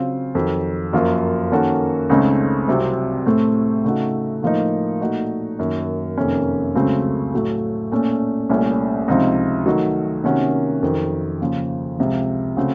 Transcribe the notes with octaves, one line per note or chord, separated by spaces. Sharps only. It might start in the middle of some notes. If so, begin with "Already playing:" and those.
Already playing: C#3 F#3 C4 F4
F2 D#3 F#3
F#2 F3 A#3
D#3 A#3 C#4 F#4 A4
C#2 C#3 A3 C4 D#4
C2 C3 F#3 C4
A2 A3 C4
C#3 A3 D#4 F#4
A2 F3 A#3 D#4
A#2 A3 D#4 F#4
F#2 D#3 A#3
F2 C3 D#3 A#3 C#4
C#2 C#3 F#3 A3 C4
A2 F#3 A3
A#2 A3 C#4
C2 A#2 A3 C#4
C#2 C3 F3 C4 D#4
D#3 F#3 A3 D#4 F#4
C3 D#3 A#3 C#4 F#4
F2 D#3 F#3
D#2 C#3 F3
C#2 C3 F3
C#3 A3 C4 F#4